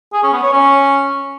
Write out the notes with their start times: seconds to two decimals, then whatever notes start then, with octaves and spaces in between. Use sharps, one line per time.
0.13 G#4
0.23 C#4
0.33 B3
0.43 C#5
0.53 C#4